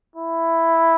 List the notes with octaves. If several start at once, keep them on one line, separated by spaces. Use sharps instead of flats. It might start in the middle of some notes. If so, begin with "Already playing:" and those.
E4